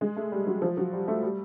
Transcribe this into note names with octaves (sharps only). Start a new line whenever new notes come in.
G#3
A3
G3
F#3
F3
F#3
G3
A3
G3